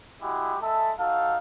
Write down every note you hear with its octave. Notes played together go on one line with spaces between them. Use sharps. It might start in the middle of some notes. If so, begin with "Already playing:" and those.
G#3 E4 F#4 G4
G#3 A4 E5 A5
D#4 F#4 A4 F5